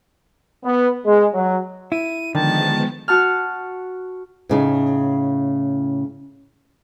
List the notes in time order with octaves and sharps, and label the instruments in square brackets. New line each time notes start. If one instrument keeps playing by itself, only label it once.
[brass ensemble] B3
G#3
F#3
[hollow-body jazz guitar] E4 [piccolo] D#7
[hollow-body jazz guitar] D3 [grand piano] D#3 [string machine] F3 G#3 B3 [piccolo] A5
[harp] F#4 A5 F6
[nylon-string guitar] A2 C#3 D#4